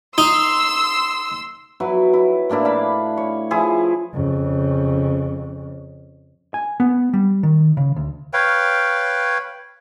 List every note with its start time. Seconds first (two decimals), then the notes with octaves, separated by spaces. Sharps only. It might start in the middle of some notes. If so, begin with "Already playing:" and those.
0.18 D#4 C6 E6
1.80 F#3 E4 B4
2.14 E4
2.50 A2 A#3 D4 E4
2.65 F5 B5
3.17 C#5
3.51 F3 E4 G#4
4.14 F2 C#3
6.54 G#5
6.80 B3
7.13 G3
7.43 D#3
7.77 C#3
7.96 D2
8.33 B4 C#5 F5 G5